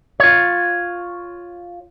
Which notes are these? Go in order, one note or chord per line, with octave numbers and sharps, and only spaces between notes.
F4 C#5